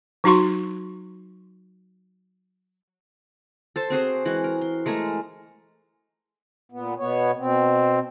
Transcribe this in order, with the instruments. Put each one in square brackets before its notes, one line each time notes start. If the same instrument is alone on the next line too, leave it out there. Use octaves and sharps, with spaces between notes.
[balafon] F#3 D#4 F#4 C6 C#6
[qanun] A4 C5 A5
C4 F#4 G#4 C5
E3 G#3 F#4
A#4
C6
G#3 A3 A#4 G#5
[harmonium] A#2 B3
B2 B3 C#5
B2 C4